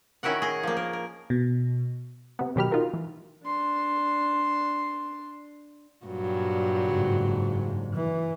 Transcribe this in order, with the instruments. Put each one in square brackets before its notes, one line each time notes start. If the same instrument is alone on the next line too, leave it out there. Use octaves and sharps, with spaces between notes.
[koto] D#3 C#4 E4 F#4 A#4 F#5
G#4 D#5
F3 A#3
A#4
A#4
[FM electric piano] B2
[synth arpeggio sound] C3 B3
B2 D#3 F#3 G4 B5 F6
D#4 F4 F#4 A#4 F5
E3
[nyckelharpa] D4 C6
[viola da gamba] G2 A#2 F#3
[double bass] F#1 G#2
E3